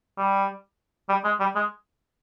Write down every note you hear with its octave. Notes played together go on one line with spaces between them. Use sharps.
G3
G3
G#3
G3
G#3